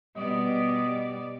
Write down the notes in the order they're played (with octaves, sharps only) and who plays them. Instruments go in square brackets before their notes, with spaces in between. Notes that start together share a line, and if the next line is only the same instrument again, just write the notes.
[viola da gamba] B2 B3 [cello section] G3 D5 [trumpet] D#5